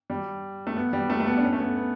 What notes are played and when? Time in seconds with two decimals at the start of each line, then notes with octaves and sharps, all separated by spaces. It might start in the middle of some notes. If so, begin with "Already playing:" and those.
0.10 G3
0.67 A3
0.76 B3
0.93 G3
1.10 A3
1.20 A3
1.27 B3
1.37 D4
1.43 C#4
1.53 A3
1.60 B3
1.77 B3